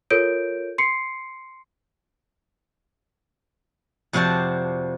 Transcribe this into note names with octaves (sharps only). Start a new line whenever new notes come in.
F4 A4 A#4 C#5 G6 D7
C6 C7 C#7
F2 C3 F#4 D5 A5